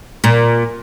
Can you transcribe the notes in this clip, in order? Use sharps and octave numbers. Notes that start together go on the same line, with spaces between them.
A#2